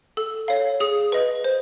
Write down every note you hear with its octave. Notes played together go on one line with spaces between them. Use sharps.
A4 E6
C#5 F5
G#4 D#6
B4 D#5
C5